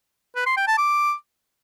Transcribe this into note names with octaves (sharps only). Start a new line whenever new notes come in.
B4
C6
G5
A5
D6